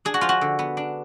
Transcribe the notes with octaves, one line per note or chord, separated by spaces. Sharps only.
D4 G#4
F#4
F3 F4
F#4
D3
B3
D4